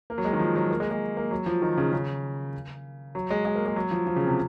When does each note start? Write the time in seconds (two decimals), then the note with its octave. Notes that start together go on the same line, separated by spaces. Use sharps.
0.10 A#3
0.18 F#3
0.25 G#3
0.33 D#3
0.39 F3
0.56 F#3
0.70 A#3
0.80 G#3
0.91 G#3
1.17 A#3
1.31 F#3
1.46 F3
1.62 D#3
1.78 C#3
1.93 C#3
3.15 F#3
3.31 G#3
3.45 G#3
3.55 A#3
3.66 G#3
3.76 F#3
3.91 F3
4.07 F3
4.16 C#3
4.27 C3